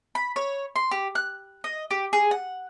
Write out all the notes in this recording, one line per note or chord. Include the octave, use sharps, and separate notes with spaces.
B5
C#5
C6
G4
F#6
D#5
G4
G#4
F#5